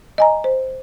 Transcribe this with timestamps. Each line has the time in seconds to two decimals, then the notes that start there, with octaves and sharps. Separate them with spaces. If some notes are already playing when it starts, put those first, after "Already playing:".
0.18 D#5 G#5 A#5
0.44 C5